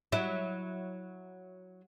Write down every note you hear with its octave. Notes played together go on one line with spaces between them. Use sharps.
F#3 E4